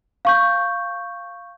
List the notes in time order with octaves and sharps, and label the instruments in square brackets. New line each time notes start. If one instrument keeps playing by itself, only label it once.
[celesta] F5 C#6 G6